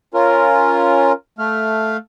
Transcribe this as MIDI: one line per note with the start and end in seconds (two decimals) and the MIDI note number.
0.14 1.12 61
0.14 1.12 65
0.14 1.12 70
1.39 1.97 57
1.39 1.97 77